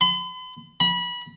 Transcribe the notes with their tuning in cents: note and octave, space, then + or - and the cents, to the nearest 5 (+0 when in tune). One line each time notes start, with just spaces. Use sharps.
B5 +45
B5 -25